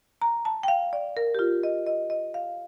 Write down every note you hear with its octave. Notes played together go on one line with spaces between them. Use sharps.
A#5
A5
G5
F5
D5
A#4
G4
F4
D#5
D#5
D#5
F5